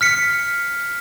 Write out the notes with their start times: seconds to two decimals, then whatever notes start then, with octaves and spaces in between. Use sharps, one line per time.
0.01 F6 B6 C#7